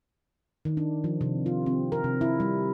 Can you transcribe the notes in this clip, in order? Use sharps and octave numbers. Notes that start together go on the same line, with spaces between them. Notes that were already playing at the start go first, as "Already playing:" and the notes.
D#3
D4
F3
C3
F4
C4
A#4
C3
E4
G3